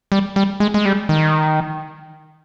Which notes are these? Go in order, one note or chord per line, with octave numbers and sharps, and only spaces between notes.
G3
G3
G#3
G#3
G3
D#3